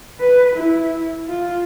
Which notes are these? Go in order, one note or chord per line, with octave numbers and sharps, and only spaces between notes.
B4
E4
F4